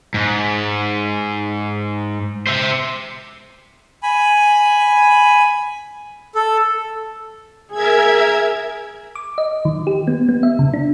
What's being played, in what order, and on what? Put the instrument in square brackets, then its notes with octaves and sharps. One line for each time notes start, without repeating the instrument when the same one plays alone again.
[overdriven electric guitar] G#2
C5 E5
[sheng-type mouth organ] G#5 B5
A4
[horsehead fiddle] G#4 [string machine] A#4 E5 G#6
[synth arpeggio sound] D6
D#5
D#3
G4
B3
B3
E5
C#3
D4